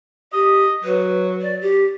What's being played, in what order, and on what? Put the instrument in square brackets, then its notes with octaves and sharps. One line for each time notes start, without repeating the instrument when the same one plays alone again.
[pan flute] G4 [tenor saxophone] D#5
[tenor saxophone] F#3 [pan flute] B4
[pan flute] D5
G4